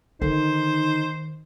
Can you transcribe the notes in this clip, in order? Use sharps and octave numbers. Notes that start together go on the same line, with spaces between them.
D3 D#3 D#4 C5